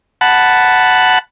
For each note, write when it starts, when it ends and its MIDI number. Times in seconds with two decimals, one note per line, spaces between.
0.21 1.19 78
0.21 1.19 81
0.21 1.19 83